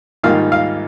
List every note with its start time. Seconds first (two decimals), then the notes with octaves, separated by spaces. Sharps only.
0.23 G#2 D#3 G3 A#3 F4 F5
0.52 F5